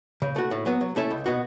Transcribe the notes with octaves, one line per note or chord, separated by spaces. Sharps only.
C#3
A3 F#4
A2
F#3 B3
F#3
A3 C#4 E4 A4
C#2
B2 B3 F#4